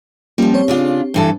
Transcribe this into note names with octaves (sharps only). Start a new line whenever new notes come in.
F3 G3 A#3 C#4 F4
C4 G4 C#5
C#3 D4 F4
G2 E3 A4